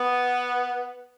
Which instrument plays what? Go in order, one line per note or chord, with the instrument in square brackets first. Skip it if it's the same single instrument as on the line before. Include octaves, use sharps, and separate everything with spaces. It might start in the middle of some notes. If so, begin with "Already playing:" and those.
Already playing: [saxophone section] B3